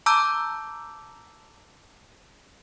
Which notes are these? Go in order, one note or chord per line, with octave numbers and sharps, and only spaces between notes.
A5 A#5 D6 E6 G6